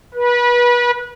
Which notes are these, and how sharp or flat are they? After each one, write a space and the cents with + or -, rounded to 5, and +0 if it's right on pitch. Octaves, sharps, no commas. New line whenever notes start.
B4 -30